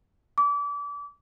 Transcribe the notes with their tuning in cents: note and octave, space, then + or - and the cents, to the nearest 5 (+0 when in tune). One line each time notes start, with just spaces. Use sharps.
D6 -30